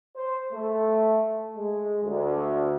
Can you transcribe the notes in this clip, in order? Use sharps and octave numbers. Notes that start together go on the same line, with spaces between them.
C5
A3
G#3
D2